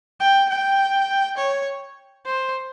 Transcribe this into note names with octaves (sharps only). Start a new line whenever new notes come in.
G5
G5
C#5
C5